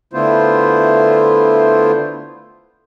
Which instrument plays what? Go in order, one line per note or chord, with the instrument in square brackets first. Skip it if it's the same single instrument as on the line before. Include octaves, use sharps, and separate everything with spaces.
[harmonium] D3 A3 B3 E4 F4 C5